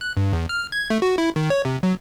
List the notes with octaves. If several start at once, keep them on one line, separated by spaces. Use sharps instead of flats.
F#6
G2
E2
F6
G#6
A3
F#4
E4
D#3
C#5
C3
F#3